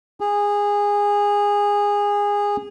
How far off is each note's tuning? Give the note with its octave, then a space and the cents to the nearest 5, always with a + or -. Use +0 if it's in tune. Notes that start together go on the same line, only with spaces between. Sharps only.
G#4 -20